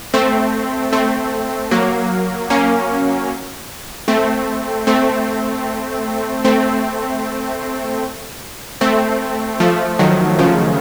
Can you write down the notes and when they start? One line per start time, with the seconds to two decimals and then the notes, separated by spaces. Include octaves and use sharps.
0.14 A3 C4
0.93 A3 C4
1.71 F#3 A#3
2.50 A#3 C#4
4.08 A3 C4
4.87 A3 C4
6.45 A3 C4
8.81 A3 C4
9.60 F3 A3
9.99 D#3 F#3
10.39 C#3 F3